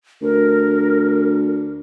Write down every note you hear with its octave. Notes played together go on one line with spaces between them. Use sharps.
D2 A#4